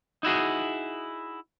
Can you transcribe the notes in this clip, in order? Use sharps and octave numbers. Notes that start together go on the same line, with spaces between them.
D#4 E4 F#4 G#4